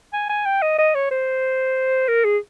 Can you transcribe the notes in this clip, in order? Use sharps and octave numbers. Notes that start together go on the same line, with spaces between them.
G#5
G#5
G5
D#5
D#5
C#5
C5
A#4
G#4